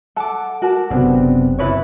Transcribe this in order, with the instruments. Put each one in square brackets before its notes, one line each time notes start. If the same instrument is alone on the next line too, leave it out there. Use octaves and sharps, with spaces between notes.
[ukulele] A4 A5 [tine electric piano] F#5 D6
[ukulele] F#4 A#4 A5
[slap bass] F#1 [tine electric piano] C3 B3 C4 [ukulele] D4
[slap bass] F#2 [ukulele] E4 B4 C#5